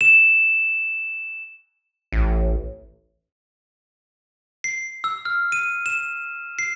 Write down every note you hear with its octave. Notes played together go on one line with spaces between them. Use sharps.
E7
A1
C7
E6
F6
D#7
E7
C7